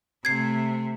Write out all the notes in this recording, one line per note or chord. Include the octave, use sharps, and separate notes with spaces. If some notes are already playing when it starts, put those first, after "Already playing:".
C3 A3 G#6 C7